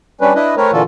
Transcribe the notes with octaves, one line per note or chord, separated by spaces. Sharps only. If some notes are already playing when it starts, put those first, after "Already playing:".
G3 C#4 D4 B4
D4 E4 B4 D#5
A3 C4 A#4 B4 C#5
A#2 D3 E3 F4 F#4 A4